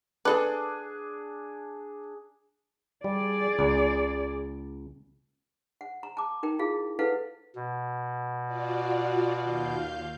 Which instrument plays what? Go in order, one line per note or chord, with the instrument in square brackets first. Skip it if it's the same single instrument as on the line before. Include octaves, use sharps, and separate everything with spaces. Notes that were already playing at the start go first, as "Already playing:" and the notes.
[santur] D4 G#4 [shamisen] A4 B4
[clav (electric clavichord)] G3 [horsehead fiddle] G#4 D5
[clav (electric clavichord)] C#2
[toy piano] F#5
A#5
A5 D6
D#4 A#4 G5
E4 F4 G#4 F5
E4 A4 B4 F5 F#5
[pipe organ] B2
[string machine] F4 F#4 D5
D#2 F5 G6